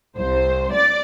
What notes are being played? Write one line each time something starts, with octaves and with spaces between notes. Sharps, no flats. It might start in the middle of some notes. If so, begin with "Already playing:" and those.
C2 C5
D5 A6